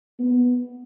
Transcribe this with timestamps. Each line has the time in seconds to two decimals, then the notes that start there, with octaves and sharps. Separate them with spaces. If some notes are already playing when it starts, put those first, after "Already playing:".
0.20 B3